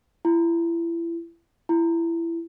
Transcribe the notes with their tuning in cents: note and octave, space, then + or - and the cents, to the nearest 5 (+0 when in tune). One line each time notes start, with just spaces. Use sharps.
E4 +30
E4 +20